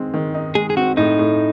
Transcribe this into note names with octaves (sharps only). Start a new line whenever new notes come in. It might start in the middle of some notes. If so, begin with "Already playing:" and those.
Already playing: D#3 G#3 C4
D#3
D#4
G#3 G#4
G#4
C4 F#4
A2 D#4
A2